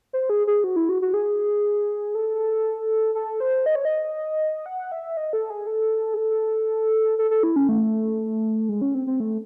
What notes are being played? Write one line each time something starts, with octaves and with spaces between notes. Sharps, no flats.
C5
G#4
G#4
F#4
E4
F#4
F#4
G#4
A4
A4
C5
D#5
C#5
D#5
F#5
E5
D#5
A4
G#4
A4
G#4
A4
A4
A4
E4
C#4
A3
G#3
C#4
C4
C4
A3